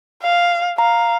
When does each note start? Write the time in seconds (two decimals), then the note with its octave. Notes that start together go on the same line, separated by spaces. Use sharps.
0.22 F5
0.78 F5 A#5